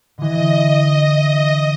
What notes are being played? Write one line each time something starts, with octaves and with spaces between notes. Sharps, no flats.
D3 E3 D#5